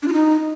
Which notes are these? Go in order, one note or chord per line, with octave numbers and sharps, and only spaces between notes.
D4
F4
D#4